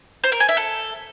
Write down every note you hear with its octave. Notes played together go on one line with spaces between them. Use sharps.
C5
A#4
G#5
E5
A4